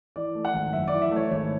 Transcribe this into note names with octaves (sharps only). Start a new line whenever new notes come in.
E3 D5
A3
F#5
G#1
F#2 E5
D5
E3
E5
A3 C#5
G#1 C#5